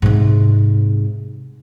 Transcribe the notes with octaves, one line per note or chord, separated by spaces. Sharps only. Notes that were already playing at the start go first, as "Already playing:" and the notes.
G#2 C3